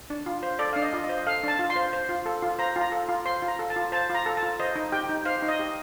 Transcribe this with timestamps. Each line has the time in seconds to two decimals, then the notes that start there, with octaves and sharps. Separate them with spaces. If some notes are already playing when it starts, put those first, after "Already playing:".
0.10 D4
0.26 F4
0.43 C5
0.59 A4 D5
0.73 D4 F5
0.82 D#5
0.93 F4
1.04 D#5
1.09 C5
1.26 A4 F5
1.43 D4 A5
1.59 F4
1.70 C6
1.76 C5
1.93 C5
2.09 F4
2.26 A4
2.42 F4
2.59 C5 A#5
2.76 F4
2.81 A#5
2.92 A4
3.09 F4
3.25 C5 C6
3.42 F4
3.48 A#5
3.59 A4
3.70 A5
3.76 F4
3.92 C5 A5
4.10 F4
4.15 A#5
4.26 A4
4.37 A5
4.43 F4
4.60 C5 D#5
4.76 D#4
4.92 G4 G5
5.09 D#4
5.25 C5 F5
5.43 D#4
5.48 D#5
5.60 G4